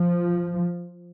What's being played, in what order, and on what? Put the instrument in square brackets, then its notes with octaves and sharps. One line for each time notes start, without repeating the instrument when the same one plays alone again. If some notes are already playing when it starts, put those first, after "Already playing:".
Already playing: [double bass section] F3